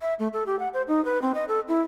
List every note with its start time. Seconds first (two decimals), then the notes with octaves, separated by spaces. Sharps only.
0.01 E5
0.19 A3
0.33 A4
0.46 G4
0.59 F#5
0.74 C5
0.88 D#4
1.05 B4
1.22 C4
1.35 D#5
1.48 A4
1.68 E4